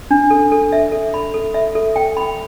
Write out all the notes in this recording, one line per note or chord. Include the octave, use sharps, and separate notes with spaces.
D4
A4
A4
E5
A4
B5
A4
E5
A4
G5
B5